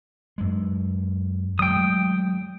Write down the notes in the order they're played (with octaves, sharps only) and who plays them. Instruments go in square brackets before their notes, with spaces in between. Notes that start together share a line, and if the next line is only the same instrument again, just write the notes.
[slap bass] F#2 G#3
[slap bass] F#3 G#3 A3 [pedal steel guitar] G5 D#6